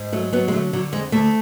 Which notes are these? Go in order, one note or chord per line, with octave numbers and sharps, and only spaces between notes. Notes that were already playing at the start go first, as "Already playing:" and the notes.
Already playing: G#2
F#3 A3
F#3 B3
G#3
D3 A3
D3 F#3
F2 G#3
D2 A3